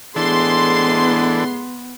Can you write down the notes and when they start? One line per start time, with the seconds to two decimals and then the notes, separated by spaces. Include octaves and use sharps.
0.16 A2 E3 G#3 B3 D4 G#4 A4 C6